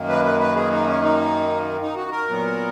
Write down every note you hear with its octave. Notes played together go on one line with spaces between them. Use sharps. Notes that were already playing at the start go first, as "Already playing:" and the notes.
Already playing: F#2 D#3 A#3
B4
B4
B4
G#4
D#4
C#4
D#4
D#4
F#4
A#4
A#2 F#3 B3